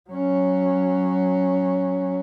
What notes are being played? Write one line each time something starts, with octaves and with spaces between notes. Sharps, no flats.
F#3 C#4